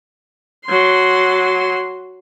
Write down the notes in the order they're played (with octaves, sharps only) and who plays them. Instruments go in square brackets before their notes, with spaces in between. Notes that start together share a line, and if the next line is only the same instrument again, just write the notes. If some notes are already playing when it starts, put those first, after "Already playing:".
[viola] F#3 C6